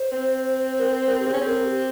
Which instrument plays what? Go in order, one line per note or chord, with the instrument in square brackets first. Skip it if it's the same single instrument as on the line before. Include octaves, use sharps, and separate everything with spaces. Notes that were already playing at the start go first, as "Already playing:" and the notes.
Already playing: [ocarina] C5
[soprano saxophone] C4
[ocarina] C5
A#4
C5
A#4
G4
[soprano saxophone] C4 [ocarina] G#4
[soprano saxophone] C#4
C4
[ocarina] A#4
G4